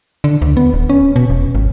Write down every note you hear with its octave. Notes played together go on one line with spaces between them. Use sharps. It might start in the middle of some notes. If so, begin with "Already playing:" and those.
D3
D2
B3
D1
C#4
B2
E1
G#1